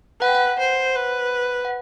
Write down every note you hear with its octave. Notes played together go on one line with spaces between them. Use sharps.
B4 F#5
G5
F#5
C5
B4
F#5